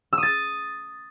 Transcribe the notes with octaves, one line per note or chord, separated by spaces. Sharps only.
E6
D#6
A6